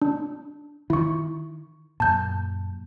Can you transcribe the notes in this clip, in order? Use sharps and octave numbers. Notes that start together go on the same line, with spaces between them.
D4
D#3 E4 C#6
F#2 A#2 A5 G6